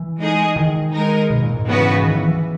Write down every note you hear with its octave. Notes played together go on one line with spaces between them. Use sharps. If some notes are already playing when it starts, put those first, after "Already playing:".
Already playing: E3
G#3 D#4 G#4 D#5
D#3
G#3 D#4 A#4
B2
A#2
G#2
C#3 E3 B3 F#4 B4
D#3
E3
E3